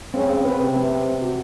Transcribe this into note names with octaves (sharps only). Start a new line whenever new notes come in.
C#3 C4
C4
B4
C3 B4
C4
C4
C4
F#4